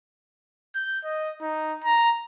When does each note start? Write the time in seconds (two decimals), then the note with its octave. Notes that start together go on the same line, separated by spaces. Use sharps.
0.75 G6
1.05 D#5
1.41 D#4
1.84 A#5